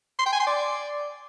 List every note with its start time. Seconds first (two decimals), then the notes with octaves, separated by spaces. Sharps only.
0.19 C6
0.26 G5
0.33 G#5
0.40 C6
0.47 D5